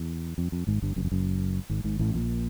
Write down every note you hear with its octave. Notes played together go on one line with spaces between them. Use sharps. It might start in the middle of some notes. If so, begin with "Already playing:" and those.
Already playing: E2
F2
F2
G#1 G#2
G1 G2
F#1 F#2
F2
F#1 F#2
G#1 G#2
G#1 G#2
A1 A2
A#1 A#2